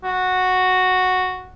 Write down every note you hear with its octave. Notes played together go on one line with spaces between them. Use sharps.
F#4